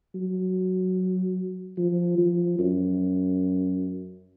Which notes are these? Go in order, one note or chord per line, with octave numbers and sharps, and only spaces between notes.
F#3
F3
F3
F#2